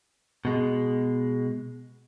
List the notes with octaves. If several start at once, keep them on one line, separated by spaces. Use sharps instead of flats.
B2 G#3